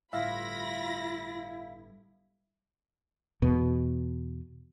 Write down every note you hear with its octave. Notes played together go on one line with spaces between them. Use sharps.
G1 A2 E4 F4 E5 F5 B5 A#6
E2 B2